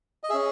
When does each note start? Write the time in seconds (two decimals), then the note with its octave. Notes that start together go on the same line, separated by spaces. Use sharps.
0.24 D#5
0.30 G#4 E5
0.34 C#4